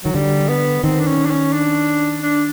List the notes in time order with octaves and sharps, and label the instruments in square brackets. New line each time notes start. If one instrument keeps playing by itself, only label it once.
[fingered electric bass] D#3 [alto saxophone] F#3
[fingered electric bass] D3 [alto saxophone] G3
[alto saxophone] B3
[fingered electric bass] D#3 [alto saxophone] C4
[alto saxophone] D4
C#4
D4
C#4
D4
D4